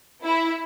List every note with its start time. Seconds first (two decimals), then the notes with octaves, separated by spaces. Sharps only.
0.25 E4